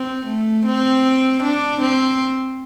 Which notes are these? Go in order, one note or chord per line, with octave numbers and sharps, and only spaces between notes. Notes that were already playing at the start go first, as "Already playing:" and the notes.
Already playing: C4
A3
C4
D4
C4